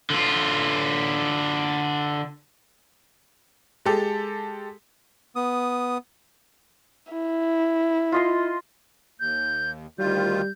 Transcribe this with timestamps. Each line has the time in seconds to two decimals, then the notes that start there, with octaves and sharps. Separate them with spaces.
0.10 D3 F4
3.85 G#3 G4 A4
5.36 B3 D#6
7.13 E4
8.12 F4 D#5 C6
9.20 D#2 G6
9.99 D2 D#3 G3 F4 G6